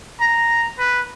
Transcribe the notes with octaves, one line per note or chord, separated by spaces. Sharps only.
A#5
B4